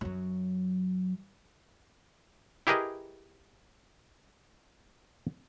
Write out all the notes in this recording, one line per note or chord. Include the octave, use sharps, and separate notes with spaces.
F#2 F#3
E4 G4 G#4 A#4 B4 D#5